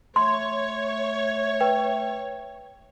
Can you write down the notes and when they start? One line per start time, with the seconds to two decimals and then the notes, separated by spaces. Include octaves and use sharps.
0.16 A3 C#5 C6
1.61 B4 G5